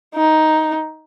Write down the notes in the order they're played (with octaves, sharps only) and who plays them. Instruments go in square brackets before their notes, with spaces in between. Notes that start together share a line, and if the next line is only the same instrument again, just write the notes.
[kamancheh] D#4